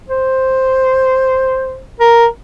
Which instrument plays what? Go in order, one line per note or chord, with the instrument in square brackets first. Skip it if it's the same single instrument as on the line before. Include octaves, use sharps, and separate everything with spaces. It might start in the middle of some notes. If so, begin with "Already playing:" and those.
[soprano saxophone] C5
A#4